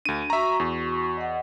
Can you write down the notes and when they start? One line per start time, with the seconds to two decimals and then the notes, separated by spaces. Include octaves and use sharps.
0.05 D2 D4 D#7
0.30 F#4 E5 A#5 C#6
0.60 E2
1.17 D#5 F#5